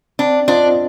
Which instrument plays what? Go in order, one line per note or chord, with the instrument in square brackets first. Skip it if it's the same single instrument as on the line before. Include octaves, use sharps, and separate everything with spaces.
[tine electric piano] C4 [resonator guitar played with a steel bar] D4
[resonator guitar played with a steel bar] D4 [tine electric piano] F4 C5 D#5